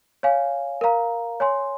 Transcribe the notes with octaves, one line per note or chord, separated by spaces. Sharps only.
C#5 F5 G#5
A#4 F5 A#5
C#5 G#5 C6